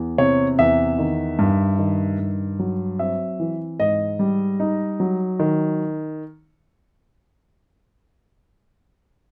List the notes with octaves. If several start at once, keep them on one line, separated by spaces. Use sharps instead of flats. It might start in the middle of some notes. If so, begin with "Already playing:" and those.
Already playing: E2
C3 C#5
E2 E5
D#3
G2
D#3
G2
F#3
C4 E5
E3
G#2 D#5
G3
D#4
F#3
D#3